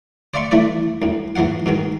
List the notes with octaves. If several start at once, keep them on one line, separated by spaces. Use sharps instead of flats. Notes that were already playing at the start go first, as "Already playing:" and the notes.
C5 D5 E5 F5 C6 C#6
E3 A3 E4 B4 D5
D2 A2
G#2 E3 F3 F5 F#5
G#2 B2 D#3 G#3